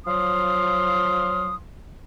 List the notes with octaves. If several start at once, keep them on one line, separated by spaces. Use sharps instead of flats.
F3 F#3 F5 C6 D#6